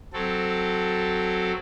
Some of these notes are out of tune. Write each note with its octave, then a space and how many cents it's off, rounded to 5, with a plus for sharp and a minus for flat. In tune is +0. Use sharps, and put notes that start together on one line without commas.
F#3 +0 C4 +0 A4 +0